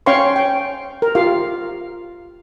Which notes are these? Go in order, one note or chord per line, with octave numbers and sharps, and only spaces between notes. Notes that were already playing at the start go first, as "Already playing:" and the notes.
C#4 C#5 F5 G5 C6 C#6
G5
A#4
F4 G4 F5